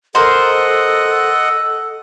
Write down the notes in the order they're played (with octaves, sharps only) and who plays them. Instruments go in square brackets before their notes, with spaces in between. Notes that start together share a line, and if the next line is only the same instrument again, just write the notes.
[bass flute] A4 [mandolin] A#4 C5 [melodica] D#5 F#5